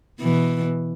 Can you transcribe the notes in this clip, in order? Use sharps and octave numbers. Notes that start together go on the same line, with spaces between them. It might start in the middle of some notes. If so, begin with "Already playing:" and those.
B2 E3